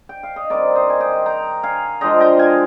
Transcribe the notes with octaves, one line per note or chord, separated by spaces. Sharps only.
G5
F5
D#5
D#3 G3 C4 A#4 D5
C5 D#5
G#5
D#5 G5
G5 A#5
F5 G#5
D3 F3 G#3 D4 D#5 G5
D#5 G5
F5 G#5